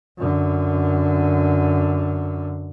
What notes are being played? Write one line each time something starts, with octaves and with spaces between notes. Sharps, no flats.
F#2 D3